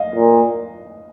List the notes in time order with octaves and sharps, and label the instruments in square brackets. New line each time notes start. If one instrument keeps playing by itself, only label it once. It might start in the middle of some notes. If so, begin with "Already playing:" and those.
Already playing: [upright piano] D#5 F5
[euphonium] A#2